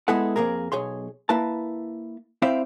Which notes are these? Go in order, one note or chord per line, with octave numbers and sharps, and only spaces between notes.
G#3 B3 E4 G#4 A4 F#5
F2 A#3 G#4 A#4
B1 G#4 C#5 C6
A#3 E4 B4 A5
C4 E4 C5 D5 E5 F5